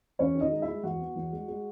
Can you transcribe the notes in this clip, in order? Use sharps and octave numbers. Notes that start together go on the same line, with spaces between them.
E2 C#4 C#5
D#3
D#4 D#5
G#3
E4 E5
G#3
E2 F#4 F#5
B3
E2
G#3
G#3